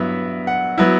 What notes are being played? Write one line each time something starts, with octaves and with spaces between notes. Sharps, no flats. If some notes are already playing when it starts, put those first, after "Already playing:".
Already playing: G2 F#3 B3 E4 E5
F#5
F#3 B3 E4